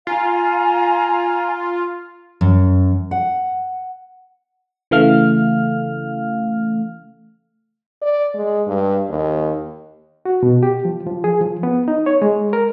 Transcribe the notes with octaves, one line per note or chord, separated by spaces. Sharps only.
F4 F5 G#5 A#5
F#2
F#5
C#3 E3 A3 F5 F6
D5
G#3
G2
D#2
F#4
B2
G4
F3
F3
G#4
F3
B3
D#4
C#5
G#3
A#4